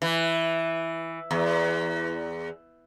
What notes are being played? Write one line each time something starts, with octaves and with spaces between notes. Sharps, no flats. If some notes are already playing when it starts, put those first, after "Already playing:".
E3
E2